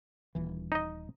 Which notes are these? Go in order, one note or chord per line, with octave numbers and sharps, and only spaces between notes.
D#1 E3
D#4 D#5